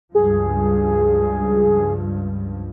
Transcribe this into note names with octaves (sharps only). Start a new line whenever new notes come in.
C#2 G2 F3 G#4